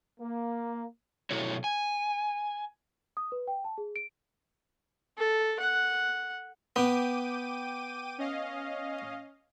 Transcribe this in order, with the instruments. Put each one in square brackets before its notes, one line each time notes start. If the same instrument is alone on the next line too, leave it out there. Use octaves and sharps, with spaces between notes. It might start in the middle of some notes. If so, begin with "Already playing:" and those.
[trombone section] A#3
[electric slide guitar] B2 F#3 E4 F#4 A4 C#5
G#5
[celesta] D#6
B4
G5
A5
G#4
D7
[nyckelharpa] A4
F#5
[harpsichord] B3 [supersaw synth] G5 D6 D#7
[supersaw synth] C#4 D#5 F5